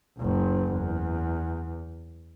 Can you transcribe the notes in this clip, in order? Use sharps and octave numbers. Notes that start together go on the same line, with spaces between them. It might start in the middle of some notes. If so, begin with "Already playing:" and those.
F#1 C#2
E2